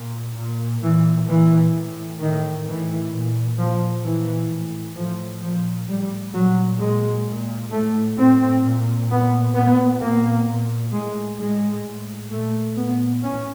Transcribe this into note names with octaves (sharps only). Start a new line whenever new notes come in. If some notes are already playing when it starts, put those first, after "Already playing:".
Already playing: A#2
A#2
A#2 E3
A#2 E3
A2
A2 D#3
A2 E3
A#2
A#2 F3
A#2 E3
A2
A2 F3
A#2 F3
A2 G3
A#2 F#3
A#2 G#3
A#2
A2 A3
A2 C4
A#2
A#2 B3
A#2 B3
A#2 A#3
A#2
A2 G#3
A2 G#3
A2
A#2 A3
A#2 B3
A2 C#4